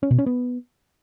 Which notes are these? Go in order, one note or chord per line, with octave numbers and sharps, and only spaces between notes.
C#4
B2
C#4
B3